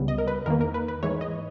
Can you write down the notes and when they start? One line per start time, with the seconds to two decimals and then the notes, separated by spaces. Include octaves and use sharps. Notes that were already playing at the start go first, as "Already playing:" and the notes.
Already playing: C#2 C#3 G3 B3
0.08 D#5
0.18 A#4
0.28 B4
0.46 E2 D#3 A#3 A#4
0.61 A#4
0.74 B4
0.88 B4
1.03 G#2 E3 G#3 C#5
1.21 D#5